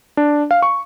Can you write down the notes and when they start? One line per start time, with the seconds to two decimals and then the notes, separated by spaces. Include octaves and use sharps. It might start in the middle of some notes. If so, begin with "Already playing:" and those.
0.17 D4
0.51 F5
0.62 C#6